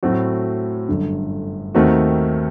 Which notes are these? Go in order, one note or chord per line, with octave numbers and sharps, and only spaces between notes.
A2 F#3 A3 C4 F#4
G1 F#2 D3
D#2 D#3 A3 C4 F#4